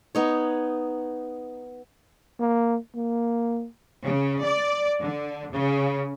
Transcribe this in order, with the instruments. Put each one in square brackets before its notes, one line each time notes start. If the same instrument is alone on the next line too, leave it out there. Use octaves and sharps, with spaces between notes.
[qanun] B3 D#4 C#5
[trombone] A#3
A#3
[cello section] C#3
D5
D3
C#3